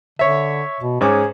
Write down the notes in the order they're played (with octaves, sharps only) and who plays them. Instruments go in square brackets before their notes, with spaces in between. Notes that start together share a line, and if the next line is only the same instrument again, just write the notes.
[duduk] D3 [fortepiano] C#5 E5
[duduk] B2
[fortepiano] G#2 C#4 D6 [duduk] G#4